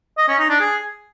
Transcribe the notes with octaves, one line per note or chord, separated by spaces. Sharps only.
D#5
C#4
D#4
D4
G#4